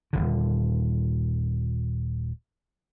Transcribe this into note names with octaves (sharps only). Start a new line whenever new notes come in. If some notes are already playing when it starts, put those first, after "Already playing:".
D#1 A#1 D3